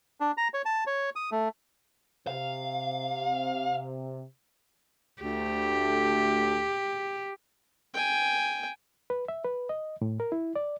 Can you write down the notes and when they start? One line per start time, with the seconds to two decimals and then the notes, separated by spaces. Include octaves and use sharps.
0.20 D4
0.37 A#5
0.54 C#5
0.65 A5
0.87 C#5
1.16 D#6
1.32 A3
2.27 C3 F5
5.23 D2 A3 G4
7.94 G5 G#5
9.10 B4
9.28 E5
9.45 B4
9.69 D#5
10.02 A2
10.20 A#4
10.32 E4
10.56 D5